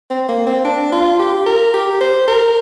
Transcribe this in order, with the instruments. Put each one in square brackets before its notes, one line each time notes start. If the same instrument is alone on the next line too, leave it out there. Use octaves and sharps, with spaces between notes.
[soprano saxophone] C4
A#3
C4
D4
F4
G4
A#4
G4
C5
A#4